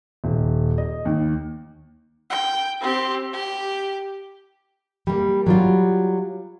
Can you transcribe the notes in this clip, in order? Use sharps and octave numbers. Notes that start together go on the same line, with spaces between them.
D#1
D#5
D#2
G5
C4 G4
G4
G3 A#3
F#3 G3 F4